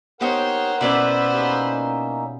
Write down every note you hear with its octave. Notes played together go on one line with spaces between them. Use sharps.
B3 D#4 G4 A#4 C5 C#5 F#5
B2 B3 C#4 E4 C5 D5 E5
A#3 C#4 D#4 G4